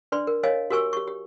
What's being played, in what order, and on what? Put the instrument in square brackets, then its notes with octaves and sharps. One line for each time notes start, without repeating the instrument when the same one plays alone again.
[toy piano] D4 B4 D5 C6
A#4
A#4 C#5 D#5 F5 G#5
F#4 G4 A#4 G#5 C#6 E6
G4 C#6
G4